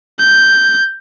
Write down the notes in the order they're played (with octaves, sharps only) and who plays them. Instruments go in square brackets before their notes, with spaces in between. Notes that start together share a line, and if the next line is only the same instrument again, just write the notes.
[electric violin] G6